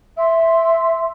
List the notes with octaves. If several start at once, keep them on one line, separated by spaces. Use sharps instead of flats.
E5 C6 E6